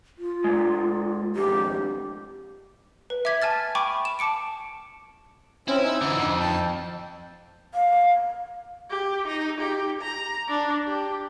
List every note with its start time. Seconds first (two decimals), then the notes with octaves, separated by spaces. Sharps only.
0.18 F4
0.44 A#2 G#3
1.36 B1 F2 G#2 G4
3.10 B4
3.25 E5 D6 G#6 B6
3.42 G#5 A5 F6 A6
3.75 G5 G#5 B5 C#6 D6
4.05 E7
4.19 A5 D6 C#7 D7
5.68 C4 C#4 E4
5.83 D#4 E6
6.02 D3 E3
6.19 F2
6.40 G5 A5
7.74 F5
8.90 G4
9.27 D#4
9.60 G4
10.01 A#5
10.48 D4
10.86 G4